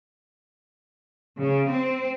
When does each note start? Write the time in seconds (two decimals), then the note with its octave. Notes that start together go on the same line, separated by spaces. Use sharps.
1.40 C#3
1.71 C4